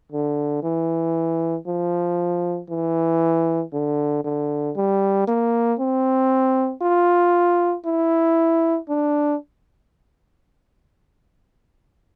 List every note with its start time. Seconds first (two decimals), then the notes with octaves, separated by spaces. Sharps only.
0.12 D3
0.63 E3
1.67 F3
2.70 E3
3.73 D3
4.25 D3
4.77 G3
5.28 A#3
5.79 C4
6.82 F4
7.86 E4
8.89 D4